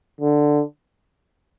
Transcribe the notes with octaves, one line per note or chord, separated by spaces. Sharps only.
D3